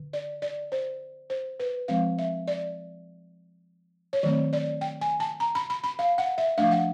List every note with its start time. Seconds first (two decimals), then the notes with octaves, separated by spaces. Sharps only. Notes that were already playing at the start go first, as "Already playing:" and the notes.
Already playing: D3
0.13 D5
0.42 D5
0.72 C5
1.30 C5
1.60 B4
1.88 F3 G#3 C4 F5
2.18 E5
2.48 D5
4.13 C#5
4.23 D#3 F#3 A3 C4 D5
4.53 D5
4.81 G5
5.01 G#5
5.20 A5
5.40 A#5
5.55 B5
5.70 B5
5.84 B5
5.99 F5
6.18 F#5
6.38 E5
6.58 F3 A3 D4 F5
6.72 F#5